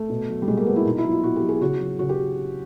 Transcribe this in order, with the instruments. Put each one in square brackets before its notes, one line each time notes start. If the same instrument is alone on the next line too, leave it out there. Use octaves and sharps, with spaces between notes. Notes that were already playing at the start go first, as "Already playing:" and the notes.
Already playing: [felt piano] A3
B2
F#3
G3
B2 G#3
A#3
F#3 B3
E4
B2 D#4
E4
F#3
F4
B2 F#4
G4
F#3
G#4
C#3 F#4
F#3
C#3 F#4
G4